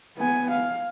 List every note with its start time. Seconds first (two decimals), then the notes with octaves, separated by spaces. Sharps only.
0.17 B3 G#5
0.52 F5